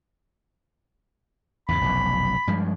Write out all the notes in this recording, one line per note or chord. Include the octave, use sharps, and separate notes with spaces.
E2 G#2 C#3 B5
F1 B1 F#2
G2 F3 G#3